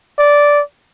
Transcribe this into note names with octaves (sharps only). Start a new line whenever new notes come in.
D5